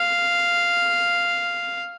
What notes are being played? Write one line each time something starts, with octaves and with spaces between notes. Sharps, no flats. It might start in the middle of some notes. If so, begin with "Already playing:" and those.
Already playing: F5